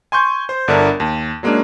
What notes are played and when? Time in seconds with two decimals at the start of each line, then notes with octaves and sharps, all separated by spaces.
0.12 G#5 C6 C#6 G6
0.49 C5
0.68 G1 D3 D4 E4 A#4
1.00 D#2
1.43 F#3 G#3 A#3 C#4 D4